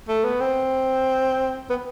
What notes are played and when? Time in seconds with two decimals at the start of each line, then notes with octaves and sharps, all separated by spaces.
0.09 A3
0.25 B3
0.41 C4
1.70 B3